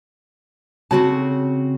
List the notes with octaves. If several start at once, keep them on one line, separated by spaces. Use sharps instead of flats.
C#3 C4 F#4 A5